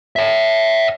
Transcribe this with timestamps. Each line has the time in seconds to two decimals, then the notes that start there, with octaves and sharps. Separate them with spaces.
0.16 C#5 E5